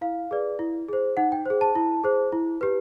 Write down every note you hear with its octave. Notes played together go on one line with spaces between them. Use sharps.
E4 F5
G#4 B4 D5
E4
G#4 C5
D#4 F#5
G5
G#4 C5
A5
E4
G#4 C5
E4
G4 B4